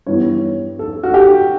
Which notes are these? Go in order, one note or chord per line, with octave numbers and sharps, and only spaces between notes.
G2 E3 G3 B3 C#5
A4
F#4
G4